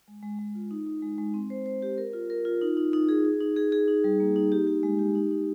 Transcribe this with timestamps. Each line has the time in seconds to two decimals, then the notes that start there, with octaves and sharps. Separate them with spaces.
0.08 G#3
0.23 G#3
0.39 G#3
0.55 F4
0.71 D#4
0.87 D#4
1.02 G#3
1.18 G#3
1.34 C4
1.50 C5
1.66 C5
1.82 G4
1.98 A#4
2.13 F4
2.30 A#4
2.45 F4
2.61 D#4
2.77 D#4
2.93 D#4
3.09 G#4
3.25 G#4
3.41 D#4
3.56 G#4
3.72 G#4
3.88 D#4
4.04 G3
4.20 A#3
4.36 D#4
4.52 G4
4.67 G4
4.83 G#3
4.99 G4
5.15 D#4
5.31 D#4